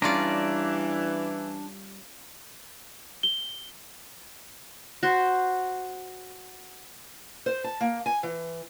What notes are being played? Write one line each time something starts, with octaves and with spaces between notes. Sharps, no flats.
E3 G3 C#4 D4 F4 D5 A#5
G7
F#4 C5
C5
A5
A#3
G#5
E3